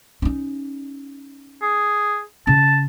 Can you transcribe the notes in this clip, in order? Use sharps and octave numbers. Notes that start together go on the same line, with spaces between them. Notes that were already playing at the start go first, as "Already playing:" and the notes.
C#4 D#4
G#4
C#3 A5